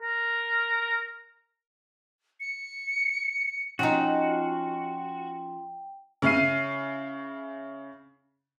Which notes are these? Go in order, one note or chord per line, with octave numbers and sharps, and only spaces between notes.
A#4
C#7
F3 C#4 D#4 F#4 G5
C#3 E4 F6 C7 D#7